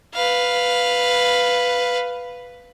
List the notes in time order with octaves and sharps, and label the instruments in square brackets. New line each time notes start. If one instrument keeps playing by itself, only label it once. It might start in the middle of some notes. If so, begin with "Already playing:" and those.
[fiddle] B4 F5